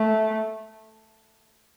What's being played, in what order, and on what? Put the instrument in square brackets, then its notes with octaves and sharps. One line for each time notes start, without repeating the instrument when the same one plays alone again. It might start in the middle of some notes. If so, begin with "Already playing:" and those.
Already playing: [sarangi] A3